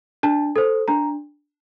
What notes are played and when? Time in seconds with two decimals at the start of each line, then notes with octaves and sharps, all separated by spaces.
0.23 D4 A5
0.56 A4 C5
0.88 D4 A#5